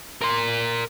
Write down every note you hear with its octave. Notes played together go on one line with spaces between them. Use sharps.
A#4 C6